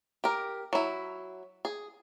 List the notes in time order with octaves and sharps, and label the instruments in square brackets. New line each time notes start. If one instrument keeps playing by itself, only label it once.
[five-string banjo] G4 A#4
F#3 E4
G#4